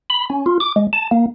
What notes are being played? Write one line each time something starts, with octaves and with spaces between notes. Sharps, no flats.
B5
C#4
F4
D6
G#3
A5
A#3